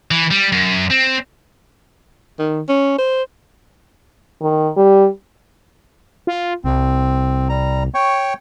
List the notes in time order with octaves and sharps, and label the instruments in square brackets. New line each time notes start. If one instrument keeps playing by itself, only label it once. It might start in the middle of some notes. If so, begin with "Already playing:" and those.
[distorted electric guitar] E3
G3
F#2
C4
[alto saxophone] D#3
C#4
C5
[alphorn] D#3
G3
[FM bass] F4
[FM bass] C2 [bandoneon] C4
[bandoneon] G3 A#5
C#5 G5 C#6